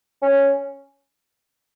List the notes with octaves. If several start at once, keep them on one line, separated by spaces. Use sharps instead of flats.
C#4